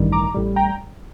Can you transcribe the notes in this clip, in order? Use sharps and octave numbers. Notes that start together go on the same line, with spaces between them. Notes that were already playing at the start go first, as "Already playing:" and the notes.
Already playing: A1 G2 D#3 G3
A#5 D6
A1 A2 G3
G5 A#5